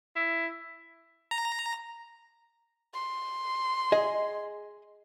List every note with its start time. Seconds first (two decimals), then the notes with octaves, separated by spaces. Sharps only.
0.16 E4
1.31 A#5
2.94 C6
3.92 G#4 D#5